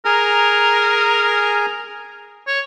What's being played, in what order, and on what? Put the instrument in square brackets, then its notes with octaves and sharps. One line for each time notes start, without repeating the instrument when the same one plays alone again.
[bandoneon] G#4 G#5 A#5 [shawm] A#4
[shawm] C#5